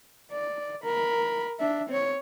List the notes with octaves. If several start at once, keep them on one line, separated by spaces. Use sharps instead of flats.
D5
A#4 B5
D4 E5
C4 C#5